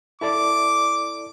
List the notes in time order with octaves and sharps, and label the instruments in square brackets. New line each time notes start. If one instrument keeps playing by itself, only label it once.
[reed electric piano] E4 A4 D5 [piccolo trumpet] D6